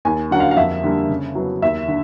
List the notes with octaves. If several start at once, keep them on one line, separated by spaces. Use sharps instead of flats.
D#2 G#5
D3 F#3 A#3 C#4 F#5
F5
F5
F2 E5
D3 G3 A#3
C#3
F#3 B3 E4
D#2 E5
D3